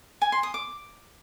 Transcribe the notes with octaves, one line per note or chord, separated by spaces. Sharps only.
G#5
C6
D#6
D6